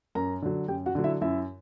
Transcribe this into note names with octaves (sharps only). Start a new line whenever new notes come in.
F#2 A#4 A#5
D3 F#3
F#2 G4 G5
F#4 F#5
D3 F#3
E4 E5
F#2 E4 E5